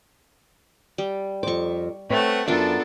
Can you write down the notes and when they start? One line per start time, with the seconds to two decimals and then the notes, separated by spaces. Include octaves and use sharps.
0.98 G3
1.43 F2 C5 C#6 D6
2.10 A3 C4 B4 C#5 F#5
2.48 F#2 B3 D4 F4 A4 A#4 E5